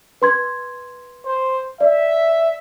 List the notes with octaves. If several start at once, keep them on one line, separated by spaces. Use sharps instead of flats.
B4 C6 G#6
C5
D5 E5